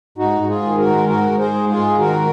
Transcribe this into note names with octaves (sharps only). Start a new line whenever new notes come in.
G#2 D#4 F#4
G#2 F#4
F4 G#4
D#3
F#4 A#4
G#3
G#2 F#4 A#4
G#2
G#4 C5
G#3
F4 G#4
G#2
D#3 F#4 A#4